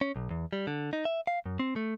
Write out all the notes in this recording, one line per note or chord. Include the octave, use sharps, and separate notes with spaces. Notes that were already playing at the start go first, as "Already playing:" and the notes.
C#4
B1
E2
G3
D3
D#4
E5
F5
F#2
C4
A3